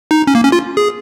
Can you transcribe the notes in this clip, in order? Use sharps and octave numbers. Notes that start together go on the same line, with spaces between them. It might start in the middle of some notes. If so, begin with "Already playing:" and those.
D#4
C#4
A#3
C#4
F4
G#4